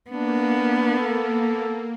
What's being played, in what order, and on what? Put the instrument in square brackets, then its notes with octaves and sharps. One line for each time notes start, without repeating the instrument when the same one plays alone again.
[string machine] A#3 [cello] B3 [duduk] D4
[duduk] A4